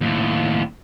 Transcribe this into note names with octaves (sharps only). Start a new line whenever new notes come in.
D#2 A2